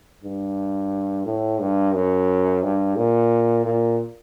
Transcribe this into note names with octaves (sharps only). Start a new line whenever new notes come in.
G2
A2
G2
F#2
G2
A#2
A#2